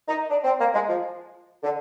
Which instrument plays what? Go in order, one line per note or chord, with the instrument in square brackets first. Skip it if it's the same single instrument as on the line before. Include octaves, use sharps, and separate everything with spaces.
[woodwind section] D#4
D4
C4
A#3
G#3
F3
D3